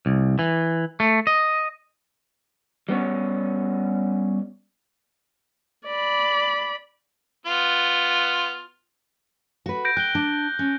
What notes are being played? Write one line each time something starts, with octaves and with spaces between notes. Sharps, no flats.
C2
E3
A3
D#5
G3 B3 C#4 C#5
D5 B5
B3 F4
F#4 B4
G6 A#6 D7
G5 F#6 G7
D4
C#4